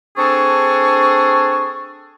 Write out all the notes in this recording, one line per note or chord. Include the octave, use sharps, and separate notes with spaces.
C4 D4 G#4 A4 C#6